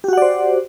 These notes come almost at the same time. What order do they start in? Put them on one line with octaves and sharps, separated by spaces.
G4 F#4 F#5 D5 C5